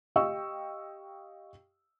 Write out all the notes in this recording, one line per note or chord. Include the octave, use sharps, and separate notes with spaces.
G4 D#5 F5 G5 C#6 E6